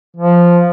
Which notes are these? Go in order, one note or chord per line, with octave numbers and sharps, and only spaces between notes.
F3